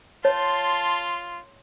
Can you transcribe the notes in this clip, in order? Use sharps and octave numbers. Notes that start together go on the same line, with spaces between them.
F4 C#5 A5 C6